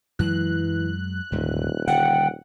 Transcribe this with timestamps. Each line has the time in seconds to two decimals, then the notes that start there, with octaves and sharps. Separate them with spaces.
0.19 F#2 E3 F#3 G#3 F#6
1.32 D#1 D2 G#2 D3
1.88 D3 G3 F#5 G5